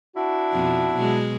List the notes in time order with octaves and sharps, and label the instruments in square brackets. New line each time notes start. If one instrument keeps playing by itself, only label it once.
[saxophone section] D4 E4 F#4
[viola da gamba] F2 B2 F3
B2 F#3 G#3